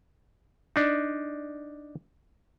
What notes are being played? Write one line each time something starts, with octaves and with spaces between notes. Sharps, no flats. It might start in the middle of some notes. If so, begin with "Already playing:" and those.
D4 D#4